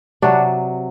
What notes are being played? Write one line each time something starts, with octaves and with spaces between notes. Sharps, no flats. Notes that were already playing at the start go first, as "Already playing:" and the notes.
C3 F#3 D4 F#4